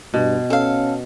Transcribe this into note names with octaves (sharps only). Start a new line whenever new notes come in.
G2 B2
C#4 A4 F5